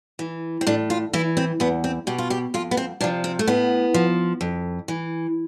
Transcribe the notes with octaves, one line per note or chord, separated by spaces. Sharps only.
E3
C4
A2 D4
F4
E3 E4
C4
E2 B3
C4
B2 G4
F4
G4
F2 F4
B3
C4
C3 F3 D4
C4
A3
A2 B3
F3
F2
E3